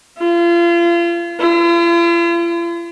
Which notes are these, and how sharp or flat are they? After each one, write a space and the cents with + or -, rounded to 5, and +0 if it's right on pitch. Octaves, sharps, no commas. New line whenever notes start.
F4 -35
F4 -45